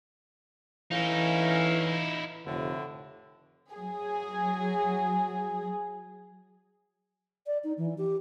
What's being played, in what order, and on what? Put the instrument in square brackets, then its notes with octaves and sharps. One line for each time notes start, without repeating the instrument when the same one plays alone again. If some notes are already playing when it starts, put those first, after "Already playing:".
[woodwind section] A2 C#4 F5 [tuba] E3 [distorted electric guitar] D#4 E4
[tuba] F1 [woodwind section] A2 D3
[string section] F#3 G#4
[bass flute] D5
D#4
E3
G4